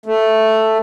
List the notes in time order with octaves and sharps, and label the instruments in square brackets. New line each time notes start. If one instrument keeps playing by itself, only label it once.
[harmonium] A3